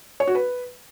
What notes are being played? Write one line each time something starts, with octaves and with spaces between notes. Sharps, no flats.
C#5
F#4
B4